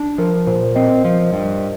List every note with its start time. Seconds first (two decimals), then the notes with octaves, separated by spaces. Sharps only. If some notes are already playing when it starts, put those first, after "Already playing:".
Already playing: D4
0.18 F3 A#4
0.47 A#2 C5
0.75 C4 D#5
1.05 F3
1.33 G2